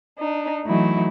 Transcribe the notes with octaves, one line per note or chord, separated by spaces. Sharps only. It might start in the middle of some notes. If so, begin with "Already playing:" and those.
D4 D#4
E3 F#3 A3 D#4 E4